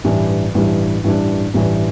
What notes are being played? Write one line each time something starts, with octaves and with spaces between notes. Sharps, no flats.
A1 G2 E3 G3 D4
A1 G2 E3 G3 D4
A1 G2 E3 G3 D4
A1 G2 E3 G3 D4